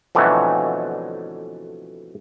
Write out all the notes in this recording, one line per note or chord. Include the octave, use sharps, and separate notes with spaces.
F2 B2 D3 E3 F#3 A3